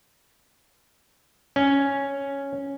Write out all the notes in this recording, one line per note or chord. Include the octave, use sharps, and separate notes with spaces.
C#4